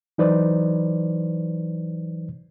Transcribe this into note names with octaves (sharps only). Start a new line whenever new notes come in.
E3 F#3 D#4 B4 C5 D5